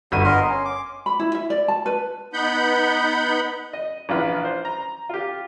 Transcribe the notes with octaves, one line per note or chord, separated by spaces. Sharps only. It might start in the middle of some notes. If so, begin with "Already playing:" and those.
G1 G3 B3 D#7
B3 A#4 D#5 C6
C#4
D6
B5
E4
E5
D5
A5
B4
B3 D#4 F#5 B5 G6
D#5
A#1 E3 F4 B4
C5
A#5
F4 G4